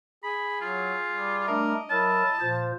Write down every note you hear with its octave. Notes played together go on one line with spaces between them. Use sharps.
G#4 B5
F#3 F4
G3
A3 D4 A#4 D#5
F#3 E4 A#4 A5
A#2 F3 C5